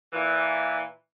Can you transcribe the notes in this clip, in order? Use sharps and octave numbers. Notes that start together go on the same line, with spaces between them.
A#2 E3